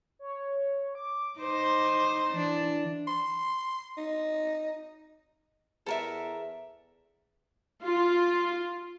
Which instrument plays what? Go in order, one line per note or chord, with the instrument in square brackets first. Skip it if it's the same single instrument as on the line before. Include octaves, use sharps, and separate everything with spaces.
[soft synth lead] C#5
D6
[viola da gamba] D#4 C5
[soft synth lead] E3 [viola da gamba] D4
[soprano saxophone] C6
D#4
[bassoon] E2 [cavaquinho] A4 A#4 E5
[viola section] F4